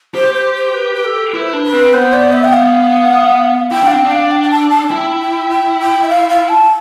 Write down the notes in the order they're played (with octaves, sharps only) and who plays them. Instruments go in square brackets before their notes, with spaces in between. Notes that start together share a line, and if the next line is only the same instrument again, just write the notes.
[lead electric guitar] G4 [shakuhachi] C5
[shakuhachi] C5
C5
B4
B4
A4
[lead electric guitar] E4 [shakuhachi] B4
[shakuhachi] C5
[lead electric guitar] D4 [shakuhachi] B4
[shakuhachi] B4
[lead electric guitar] C4
[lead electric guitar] B3 [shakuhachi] C5
[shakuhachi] D5
E5
G5
F5
[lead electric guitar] E4 [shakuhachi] G5
[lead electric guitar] D4 [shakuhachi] F5
[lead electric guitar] C4 [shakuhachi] G5
[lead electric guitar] D4
[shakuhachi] F5
G5
G5
A5
A5
[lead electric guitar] E4 [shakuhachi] G5
[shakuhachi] G5
G5
G5
E5
F5
F5
A5